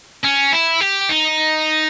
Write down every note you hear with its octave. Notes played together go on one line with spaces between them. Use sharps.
C#4
E4
G4
D#4